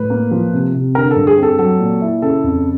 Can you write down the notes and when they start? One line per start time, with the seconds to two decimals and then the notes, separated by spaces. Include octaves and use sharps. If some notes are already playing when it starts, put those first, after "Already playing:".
Already playing: A2 B4
0.10 A#3
0.31 F3
0.53 C3
0.74 C3
0.95 D3 A#4
1.11 A4
1.16 G2
1.27 G#4
1.37 C4
1.43 A4
1.59 F#3 A4
1.80 A#2
2.02 E4
2.22 C#3 A4
2.44 F2